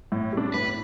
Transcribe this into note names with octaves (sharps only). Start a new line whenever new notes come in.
A2
G3 D4
A2 B4